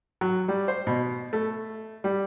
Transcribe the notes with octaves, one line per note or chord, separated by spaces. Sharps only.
F#3
G3
C5
B2
A3
G3